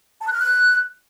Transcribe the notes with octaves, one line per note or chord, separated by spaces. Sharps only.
A5
F#6
F6
F#6